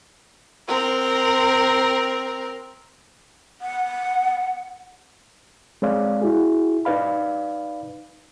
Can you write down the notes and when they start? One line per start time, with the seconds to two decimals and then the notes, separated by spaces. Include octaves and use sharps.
0.68 C4 A#4
3.61 F#5
5.82 G#3 C4 C#5 D5 F5
6.22 E4 F#4 G#4
6.85 D#4 B4 D5 F5 B5